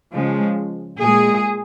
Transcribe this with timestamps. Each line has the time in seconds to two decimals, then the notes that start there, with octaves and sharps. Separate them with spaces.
0.13 C#3 F3 G#3
1.00 A#2 G#3 G#4